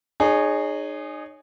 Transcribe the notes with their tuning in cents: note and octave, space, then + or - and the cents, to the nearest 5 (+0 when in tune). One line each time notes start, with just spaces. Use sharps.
D#4 -30 G#4 +0 C#5 +0